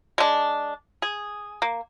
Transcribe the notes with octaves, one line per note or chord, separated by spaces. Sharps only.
G#3 D4
G#4
A#3